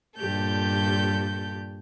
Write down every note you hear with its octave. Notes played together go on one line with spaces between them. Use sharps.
G2 A#2 G4 A4 G6